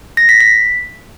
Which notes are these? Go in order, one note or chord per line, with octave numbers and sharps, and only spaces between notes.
A#6
B6
B6